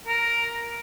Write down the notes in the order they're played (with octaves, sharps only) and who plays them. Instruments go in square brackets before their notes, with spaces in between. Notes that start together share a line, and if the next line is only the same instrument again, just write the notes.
[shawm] A#4